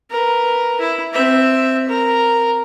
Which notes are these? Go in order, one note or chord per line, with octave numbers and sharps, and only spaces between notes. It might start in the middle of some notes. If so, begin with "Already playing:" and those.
A#4 B4
E4
C4 E5
A#4